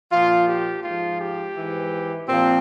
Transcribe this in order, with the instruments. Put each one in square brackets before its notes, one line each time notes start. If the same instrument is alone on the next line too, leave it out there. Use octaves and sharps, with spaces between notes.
[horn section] A#2 F3 F4
G4
G#2 F3 F4
G4
G#2 E3
A#2 F3 C4